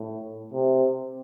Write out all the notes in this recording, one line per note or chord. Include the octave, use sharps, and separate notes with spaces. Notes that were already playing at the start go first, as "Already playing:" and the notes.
Already playing: A2
C3